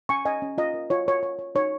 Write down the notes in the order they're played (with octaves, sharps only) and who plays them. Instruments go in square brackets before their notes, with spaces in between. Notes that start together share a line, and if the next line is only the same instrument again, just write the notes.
[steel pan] C#4 G#5 C#6
C#4 D#5 G#5
C#4
F4 D#5
A#4
F4 C#5
A#4 C#5
C#5
C#5
D#4 C#5